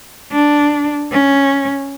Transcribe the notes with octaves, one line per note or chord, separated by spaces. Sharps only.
D4
C#4